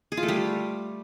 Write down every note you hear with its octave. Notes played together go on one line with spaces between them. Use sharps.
G#4
F4
A3
G3